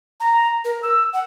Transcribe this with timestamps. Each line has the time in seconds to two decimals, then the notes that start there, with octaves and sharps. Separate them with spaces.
0.20 A#5
0.64 A#4
0.82 E6
1.13 F#5